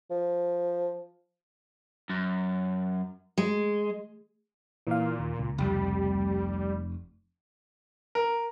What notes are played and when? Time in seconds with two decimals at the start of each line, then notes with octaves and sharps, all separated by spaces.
0.11 F3
2.10 F#2
3.38 G#3
4.87 A#2 E3 F5
5.19 D#2
5.39 C#2
5.58 F1 G3
8.15 A#4